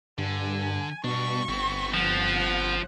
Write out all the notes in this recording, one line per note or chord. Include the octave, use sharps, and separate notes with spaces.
G2 D3 G#5
G2 B2 D4 C#6
G1 B3 C4
F3 F#5